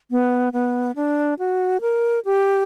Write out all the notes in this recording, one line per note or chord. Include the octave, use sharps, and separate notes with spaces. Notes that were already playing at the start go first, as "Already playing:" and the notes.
B3
B3
D4
F#4
A#4
G4